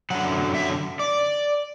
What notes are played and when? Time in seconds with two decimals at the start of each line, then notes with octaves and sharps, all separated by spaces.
0.10 F#2 D3 F#3 F#5
0.55 E5
0.99 D5